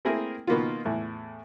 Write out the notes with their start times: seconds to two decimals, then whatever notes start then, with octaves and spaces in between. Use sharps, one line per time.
0.05 A3 A#3 C4 E4 G#4 A#4
0.47 B2 D#3 A#3 B3 F4
0.85 E2 A2 E3